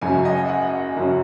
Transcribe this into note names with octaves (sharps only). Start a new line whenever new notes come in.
F#1 F#2 C#3 F#3 G#5
D#5
F#5
F#1 F#2 F#3 C#4